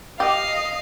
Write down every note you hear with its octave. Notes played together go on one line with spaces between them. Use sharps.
G4 D#5 F5